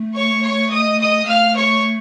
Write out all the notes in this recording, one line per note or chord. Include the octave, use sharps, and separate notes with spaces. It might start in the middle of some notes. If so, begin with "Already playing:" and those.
Already playing: A3
C#5 C#6
C#5 C#6
D#5 D#6
D#5 D#6
A3 F5 F6
C#5 C#6